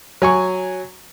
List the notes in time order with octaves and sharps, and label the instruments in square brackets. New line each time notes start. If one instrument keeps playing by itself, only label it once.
[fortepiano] F#3 G#5 C#6